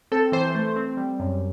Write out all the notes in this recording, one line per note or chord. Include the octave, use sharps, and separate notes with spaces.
C4 A4
E3 C5
A3
C4
G3
F#2